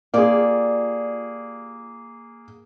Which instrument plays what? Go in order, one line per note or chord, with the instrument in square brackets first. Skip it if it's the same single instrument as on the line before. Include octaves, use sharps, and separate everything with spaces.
[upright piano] A#3 G#4 [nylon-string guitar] F4 G4 D5